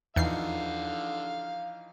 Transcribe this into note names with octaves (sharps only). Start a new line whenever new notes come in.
E2 D3 E3 F3 D#4 F5 C7